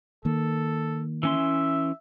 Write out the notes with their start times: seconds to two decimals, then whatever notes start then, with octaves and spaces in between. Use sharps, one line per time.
0.25 D#3 A#3 A4
1.23 E3 C#4 E5 C6